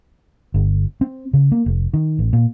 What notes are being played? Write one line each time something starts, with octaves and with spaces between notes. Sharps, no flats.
G1
C4
C#3
A#3
F1
D#3
A1
A#2